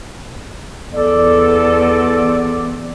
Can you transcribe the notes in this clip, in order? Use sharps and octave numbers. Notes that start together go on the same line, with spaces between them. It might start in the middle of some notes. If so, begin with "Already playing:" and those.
E2 A4 D5